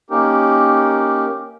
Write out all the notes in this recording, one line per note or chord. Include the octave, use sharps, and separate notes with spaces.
A#3 C#4 D#4 G4 A#4